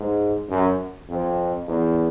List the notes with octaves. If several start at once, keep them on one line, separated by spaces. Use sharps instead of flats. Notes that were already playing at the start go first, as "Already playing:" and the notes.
Already playing: G#2
F#2
F2
E2